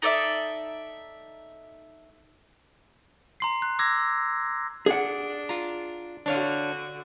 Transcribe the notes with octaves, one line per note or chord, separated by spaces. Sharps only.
D#4 A4 D5 E5
A#5 C6 C7
F#6
D6 E6 G#6 A#6
D4 G#4 F#5
F4 A#5
D3 D4 F#4 C#5 F5